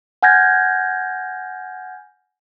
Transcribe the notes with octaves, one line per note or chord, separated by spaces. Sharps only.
F#5 G#5 F6 G6 G#6 A#6